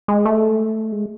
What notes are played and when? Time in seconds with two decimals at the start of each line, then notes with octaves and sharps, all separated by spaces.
0.08 G#3
0.25 A3
0.92 G#3